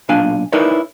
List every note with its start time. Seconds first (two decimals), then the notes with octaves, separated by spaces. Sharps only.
0.09 B1 A#2 D4 F5 G#5
0.53 D#4 E4 A#4 B4 C#5 D5